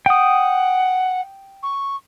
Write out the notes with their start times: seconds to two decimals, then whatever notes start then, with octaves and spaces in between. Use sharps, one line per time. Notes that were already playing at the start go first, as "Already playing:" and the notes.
0.06 F#5 G5 D#6
1.62 C#6